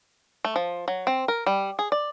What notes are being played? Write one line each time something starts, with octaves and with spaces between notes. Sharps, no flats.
A3
F3
F#3
C4
A#4
G3
G#4
D5